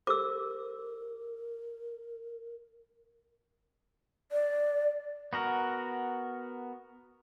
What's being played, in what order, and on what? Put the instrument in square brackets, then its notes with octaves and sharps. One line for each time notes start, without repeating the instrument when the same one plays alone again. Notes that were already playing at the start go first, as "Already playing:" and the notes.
[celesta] G4 A4 C5 [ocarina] A#4 [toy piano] D6 E6
[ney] D5
[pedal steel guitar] B3 F#4 A#4